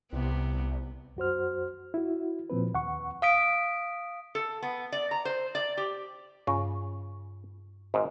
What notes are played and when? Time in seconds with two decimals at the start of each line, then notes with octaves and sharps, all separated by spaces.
0.13 C2 C3 B3
1.17 F#2 F#4 C5 F6
1.94 E4 F#4
2.50 A#2 F3 C4 B4
2.74 D#2 F#5 C#6
3.22 F5 D#6 B6 D7
4.35 A4
4.62 B3
4.92 D5
5.11 A#5
5.25 C5
5.55 D5
5.77 G4
6.47 G2 C#3 C#6
7.94 G#1 G#2